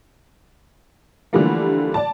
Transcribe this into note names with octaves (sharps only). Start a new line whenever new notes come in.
D3 E3 F3 G3 A3 A#3
D5 A5